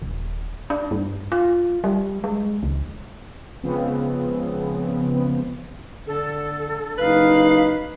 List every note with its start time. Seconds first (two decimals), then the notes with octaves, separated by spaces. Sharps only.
0.02 D#1
0.70 D4
0.91 G2
1.32 F4
1.84 G3
2.24 G#3
2.63 C#2
3.63 C#3 F3 G#3 B3 C4
6.07 D3 A4
6.98 F#1 D#4 B4 F5